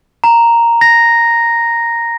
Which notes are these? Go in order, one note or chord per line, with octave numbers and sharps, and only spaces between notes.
A#5
A#6